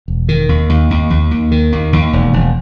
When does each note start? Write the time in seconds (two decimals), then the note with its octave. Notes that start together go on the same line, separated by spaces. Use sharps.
0.08 E1
0.29 D#3
0.49 D#2
0.69 D#2
0.90 D#2
1.10 D#2
1.31 D#2
1.51 D#3
1.72 D#2
1.93 D#2
2.13 E1
2.33 E1